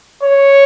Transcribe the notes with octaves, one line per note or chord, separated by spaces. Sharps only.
C#5